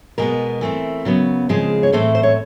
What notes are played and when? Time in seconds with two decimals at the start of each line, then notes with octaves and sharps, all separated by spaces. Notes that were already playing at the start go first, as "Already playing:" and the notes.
0.18 B2 G#3 B3 A#4
0.61 E3 A3 C4
1.05 C#3 F#3 B3
1.49 C#3 F3 G#3 C4
1.83 C#5
1.93 A2 E3 A3 C4 C5
2.15 C5
2.23 C#5